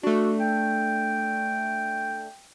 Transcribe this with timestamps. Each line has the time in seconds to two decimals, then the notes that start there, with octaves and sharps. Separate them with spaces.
0.03 A3 D4 F#4
0.40 G5